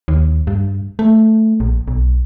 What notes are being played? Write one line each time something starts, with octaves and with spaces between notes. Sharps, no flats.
D#2
G2
A3
A#1
B1